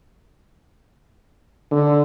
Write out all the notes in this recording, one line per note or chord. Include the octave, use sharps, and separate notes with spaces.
D3